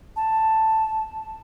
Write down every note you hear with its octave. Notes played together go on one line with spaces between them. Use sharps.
A5